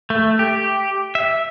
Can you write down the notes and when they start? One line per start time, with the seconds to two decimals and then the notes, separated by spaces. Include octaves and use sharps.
0.10 A3
0.39 G4
1.15 E5